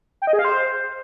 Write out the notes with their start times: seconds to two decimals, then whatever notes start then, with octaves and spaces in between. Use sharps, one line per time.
0.22 G5
0.27 D#5
0.33 G#4
0.39 F5
0.45 C5